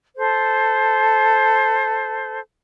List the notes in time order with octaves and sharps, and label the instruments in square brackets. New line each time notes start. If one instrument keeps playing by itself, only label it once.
[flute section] A4 C5